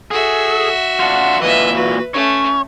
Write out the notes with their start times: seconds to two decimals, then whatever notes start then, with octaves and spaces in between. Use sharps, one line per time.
0.11 F#4 G#4 A4 E5
1.00 D4 F4 F#5
1.41 A#2 E3 B4 D#5 E5
1.75 F#4 B4
2.14 A3 C#4 C#5